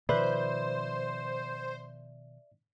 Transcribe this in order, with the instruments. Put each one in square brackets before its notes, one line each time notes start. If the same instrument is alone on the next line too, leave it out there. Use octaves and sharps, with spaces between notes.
[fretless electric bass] B2 D#3 F3 [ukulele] B4 [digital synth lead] C5 [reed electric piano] D5 E5